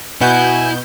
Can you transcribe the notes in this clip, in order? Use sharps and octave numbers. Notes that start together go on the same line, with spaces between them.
B2 E4 F#5 G#5 G6